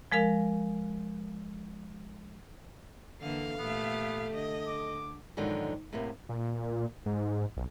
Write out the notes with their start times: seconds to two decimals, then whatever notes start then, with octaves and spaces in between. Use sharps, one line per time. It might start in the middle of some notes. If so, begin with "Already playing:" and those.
0.12 F3 G#3 A#4 F5
3.21 D3 E3 A#3 A4 F5
3.59 A#2 A3 B3 G4
4.33 D3 D#5
4.66 D6
5.37 G#2 B2 D3 D#3 F3 F#3
5.93 A2 C3 A#3 B3
6.29 A#2
7.06 G#2
7.57 B1